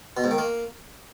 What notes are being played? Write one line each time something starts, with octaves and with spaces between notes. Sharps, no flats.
B2
G#2
D#3
A#3